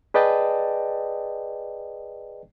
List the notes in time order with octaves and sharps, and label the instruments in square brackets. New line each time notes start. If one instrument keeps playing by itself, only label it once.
[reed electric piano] G#4 B4 D5 D#5 G5 A5